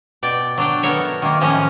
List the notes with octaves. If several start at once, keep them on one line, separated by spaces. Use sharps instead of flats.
B2 D5 G5
F#3 D4 G5
B3 A4 A#4 C#5 E5
D#3 A#3
A2 D#3 F3 C#4 C#5 D#5